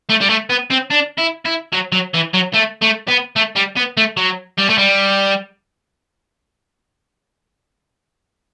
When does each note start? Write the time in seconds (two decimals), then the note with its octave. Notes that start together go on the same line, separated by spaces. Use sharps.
0.09 A3
0.21 G3
0.29 A3
0.50 B3
0.71 C4
0.91 D4
1.18 E4
1.45 E4
1.73 F#3
1.92 F#3
2.14 E3
2.34 F#3
2.54 A3
2.82 A3
3.08 B3
3.36 A3
3.56 G3
3.76 B3
3.97 A3
4.17 F#3
4.58 G3
4.69 A3
4.78 G3